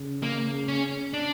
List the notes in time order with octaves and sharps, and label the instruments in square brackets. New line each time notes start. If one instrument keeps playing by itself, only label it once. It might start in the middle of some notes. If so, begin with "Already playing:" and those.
Already playing: [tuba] C#3
[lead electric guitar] A#3
C#4
D4